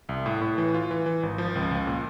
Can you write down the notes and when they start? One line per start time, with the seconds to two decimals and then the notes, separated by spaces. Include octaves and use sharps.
0.09 C2
0.26 A2
0.41 A2
0.58 E3
0.74 F4
0.91 E3
1.06 E3
1.23 G#1
1.38 F3
1.55 C#2
1.71 C#2
1.87 A#2